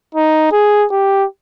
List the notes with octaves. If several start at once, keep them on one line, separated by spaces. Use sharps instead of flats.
D#4
G#4
G4